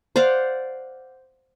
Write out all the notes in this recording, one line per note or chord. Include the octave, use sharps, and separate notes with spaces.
C5 D5 F5 F#5